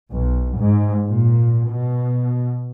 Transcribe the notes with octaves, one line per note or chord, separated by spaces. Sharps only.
B1
G#2
A#2
B2